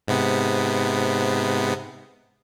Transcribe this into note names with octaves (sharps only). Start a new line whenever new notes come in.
G#2 C3 B3